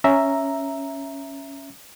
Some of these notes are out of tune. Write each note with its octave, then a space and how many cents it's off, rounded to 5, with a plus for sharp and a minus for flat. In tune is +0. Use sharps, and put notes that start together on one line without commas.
C#4 +0 E5 +0 A#5 +0